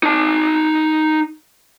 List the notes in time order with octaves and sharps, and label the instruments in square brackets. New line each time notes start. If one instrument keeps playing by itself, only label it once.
[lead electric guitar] D#4 A5